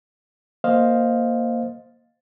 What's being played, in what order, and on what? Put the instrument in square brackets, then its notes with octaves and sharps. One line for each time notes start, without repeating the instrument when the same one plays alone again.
[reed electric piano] A#3 C5 D#5 F5